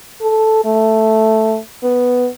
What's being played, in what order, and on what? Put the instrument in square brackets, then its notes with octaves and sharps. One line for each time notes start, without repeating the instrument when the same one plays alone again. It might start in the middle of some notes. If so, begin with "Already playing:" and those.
[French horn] A4
A3
B3